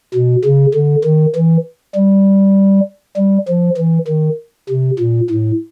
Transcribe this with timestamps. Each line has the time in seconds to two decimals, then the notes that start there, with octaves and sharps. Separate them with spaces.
0.14 B2
0.45 C#3
0.74 D3
1.04 D#3
1.36 E3
1.95 G3
3.17 G3
3.48 F3
3.77 E3
4.08 D#3
4.70 C3
4.99 A#2
5.30 A2